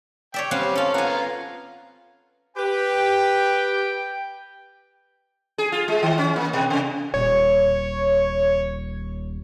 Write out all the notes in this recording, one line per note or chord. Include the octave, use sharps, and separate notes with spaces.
C#5 D5 E5 G5
G3 C4 C#4 F5 F#5
C#4 F4 A4
B3 F4 F#5 G#5 A#5
G4 B4 G5
G#4
F4
G#3
D#3
C#4
A#3
B2
C3
D#1 C#5